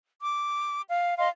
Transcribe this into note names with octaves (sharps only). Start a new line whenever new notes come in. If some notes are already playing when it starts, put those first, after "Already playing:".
D6
F5
D#5 F5 C6